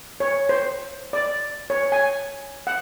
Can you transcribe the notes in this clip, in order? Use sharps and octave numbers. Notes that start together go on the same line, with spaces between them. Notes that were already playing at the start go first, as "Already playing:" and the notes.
C#5
C5
D5
C#5
G#5
F#5